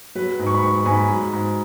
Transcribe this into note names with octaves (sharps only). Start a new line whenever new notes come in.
F#3 B4
G#2
C#6
B5
G#2 C#6
B5
G#2 G#5
B5
F#3
G#2